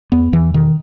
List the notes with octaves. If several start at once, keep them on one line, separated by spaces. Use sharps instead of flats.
E2 B3
E2 E3
B2 D#3